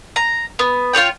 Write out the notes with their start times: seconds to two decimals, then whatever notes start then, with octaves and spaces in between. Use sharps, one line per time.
0.16 A#5
0.59 B3
0.93 F4 G#4 C#5 G5